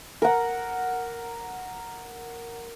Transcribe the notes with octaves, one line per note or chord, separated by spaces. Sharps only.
A#4 F#5